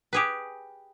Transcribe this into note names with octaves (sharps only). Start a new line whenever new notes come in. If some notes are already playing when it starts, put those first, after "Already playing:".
G4 G#4 B4